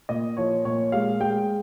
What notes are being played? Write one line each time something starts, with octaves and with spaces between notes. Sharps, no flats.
A#2 D#5
F3 C#5
A#2 C#5
G#3 F5
G#3 G5